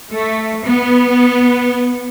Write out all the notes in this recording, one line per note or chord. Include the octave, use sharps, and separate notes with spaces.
A3
B3